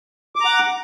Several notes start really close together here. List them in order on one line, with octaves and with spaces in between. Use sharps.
D6 A#5 F#5